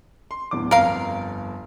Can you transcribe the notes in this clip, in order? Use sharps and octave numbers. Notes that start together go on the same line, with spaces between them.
C6
D1 E2 D6
G1 F2 A#4 F5